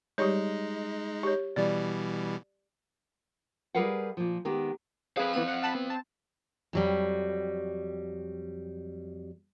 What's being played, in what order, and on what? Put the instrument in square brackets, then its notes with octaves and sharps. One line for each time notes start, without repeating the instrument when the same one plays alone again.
[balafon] G3 G4 C#5 [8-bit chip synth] G#3 D#4
[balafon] G4 C#5
[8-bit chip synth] B2 E3 G3 [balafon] D5
[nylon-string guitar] G3 G#4 A#4 B4 F5 F#5
A#2 F3
D#3 G#3 B3 G4
[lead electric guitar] C4 F5 [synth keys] G#4 B4
[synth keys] E3 B3 D#7
F#5
F#5 A5 B5
B3
A5
[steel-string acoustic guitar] F2 F#3 G3